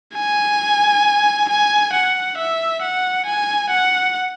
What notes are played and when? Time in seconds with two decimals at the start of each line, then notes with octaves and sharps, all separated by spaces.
0.16 G#5
1.50 G#5
1.93 F#5
2.38 E5
2.82 F#5
3.26 G#5
3.71 F#5